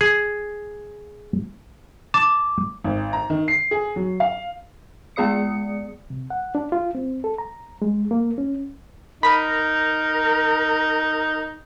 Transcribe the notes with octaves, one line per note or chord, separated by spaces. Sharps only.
G#4
A5 D6
G#1
A#5
D#3
C7
G#4
F#3
F5
G#3 B3 G#4 D5 D#6 C#7
C3
F#5
D4
F4
C4
A4
A#5
G#3
A#3
C#4
D#4 A#4 B5 B6 D#7